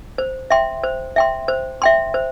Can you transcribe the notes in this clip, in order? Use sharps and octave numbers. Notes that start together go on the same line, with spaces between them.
C5
E5 G5 C6
C5
E5 G5 C6
C5
E5 G5 C6
C5